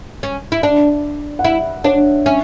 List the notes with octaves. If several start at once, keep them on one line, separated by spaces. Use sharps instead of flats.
C#4
E4
D4 D5
F#5
E4 E5
D4 C#5
C#4 E5